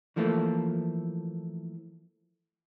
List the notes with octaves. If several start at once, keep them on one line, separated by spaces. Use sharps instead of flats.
E3 F3 A3 A#3 E4 A4